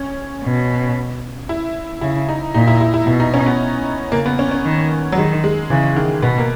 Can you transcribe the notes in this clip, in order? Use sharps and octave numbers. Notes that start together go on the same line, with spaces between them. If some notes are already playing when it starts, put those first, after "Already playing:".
Already playing: C#4
B2
E4
C#3 E4
D#4
A#2 D#4
E4
E4
E4
B2 E4
D#4
C#4
B3
C#3 A#3
B3
C#4
C#4
D#3
F#3
D#3 G#3
G#3
C#3 E3
D#3
B2 B3
A#3